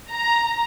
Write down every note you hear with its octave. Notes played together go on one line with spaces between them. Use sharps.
A#5